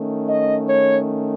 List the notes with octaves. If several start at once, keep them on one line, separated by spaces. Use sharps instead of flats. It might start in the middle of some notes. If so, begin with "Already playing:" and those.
Already playing: D#3 A3 C#4
D#5
C#5